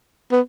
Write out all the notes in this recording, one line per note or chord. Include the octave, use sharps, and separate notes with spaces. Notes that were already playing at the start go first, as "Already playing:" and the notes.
B3